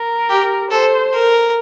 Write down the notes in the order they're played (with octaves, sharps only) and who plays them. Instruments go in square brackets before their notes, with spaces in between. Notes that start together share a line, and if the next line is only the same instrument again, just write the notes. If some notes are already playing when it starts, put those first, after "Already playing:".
Already playing: [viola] A#4
[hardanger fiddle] G4
[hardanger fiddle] A4 [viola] C5
[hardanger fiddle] A#4